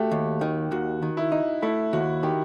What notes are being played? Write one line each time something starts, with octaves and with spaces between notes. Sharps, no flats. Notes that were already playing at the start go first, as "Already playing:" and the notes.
Already playing: A3 F#4 G4
D#2
D#3
D#2 F#4
D#3
E4
D#4
A3 E4
D#2 F#4
D#3 G4